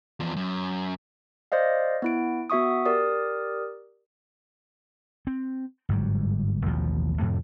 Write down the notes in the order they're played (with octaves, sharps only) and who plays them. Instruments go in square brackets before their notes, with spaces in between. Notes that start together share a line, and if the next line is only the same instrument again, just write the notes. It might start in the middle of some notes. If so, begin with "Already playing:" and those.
[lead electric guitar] E2 F3
F#2
[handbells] C5 D5 D#5 F5
B3 E4 D7
B3 F#4 E5 C#6 D#6
G4 A#4 D5 D#6
[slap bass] C4
G1 G#2 F#3 G3
A1 D#2 B2 F3
F2 A2 C3 A3